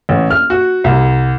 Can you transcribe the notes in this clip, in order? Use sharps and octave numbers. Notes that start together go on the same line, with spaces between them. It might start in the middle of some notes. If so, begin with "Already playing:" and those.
A1
F6
F#4
C2